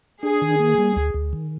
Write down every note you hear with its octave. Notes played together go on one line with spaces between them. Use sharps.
D4 G#4
D#3
A#3
G3
D2
D2
D#3